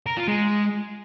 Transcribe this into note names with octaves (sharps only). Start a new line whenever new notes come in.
A#4
F4
G#3